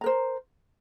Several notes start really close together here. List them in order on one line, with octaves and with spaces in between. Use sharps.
A#5 A#4 C5